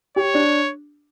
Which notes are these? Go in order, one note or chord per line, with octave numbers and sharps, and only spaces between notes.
G4 C#5
D4